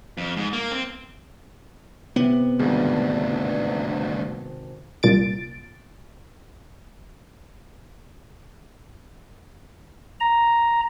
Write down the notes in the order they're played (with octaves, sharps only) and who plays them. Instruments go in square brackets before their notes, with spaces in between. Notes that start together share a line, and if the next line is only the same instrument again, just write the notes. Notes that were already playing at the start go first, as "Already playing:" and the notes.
[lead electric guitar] F2
G#2
A#3
C4
[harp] C3 [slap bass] B3
[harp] G#1 G#4 [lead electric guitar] D2 G2
[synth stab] C2 A#2 A6 D7
[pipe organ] A#5